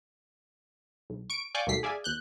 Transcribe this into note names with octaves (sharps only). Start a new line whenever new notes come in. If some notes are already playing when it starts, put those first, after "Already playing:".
B1
C#6 D7
D5 F5 G5 G#5 C#6 D6
D#2 B2 G3 A3 B6 C7
G#4 D5 E5 F5 G#5
D#2 F#6 G6